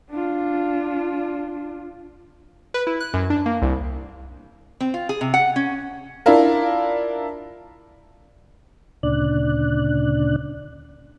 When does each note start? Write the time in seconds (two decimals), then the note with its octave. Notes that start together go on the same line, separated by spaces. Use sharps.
0.10 D4 F4
2.74 B4
2.87 E4
3.00 F#6
3.14 F#2
3.30 D4
3.46 A#3
3.62 C2
4.80 C4
4.94 F4
5.09 G#4
5.21 C3
5.34 F#5
5.56 C#4
6.26 D4 E4 F4 A#4
9.03 D2 A#2 C#3 D4 D5 F#6